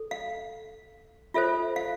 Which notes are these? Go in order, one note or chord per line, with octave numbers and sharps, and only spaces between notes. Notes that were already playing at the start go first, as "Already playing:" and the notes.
Already playing: A4
F5
F4 A4 C5 E5
F5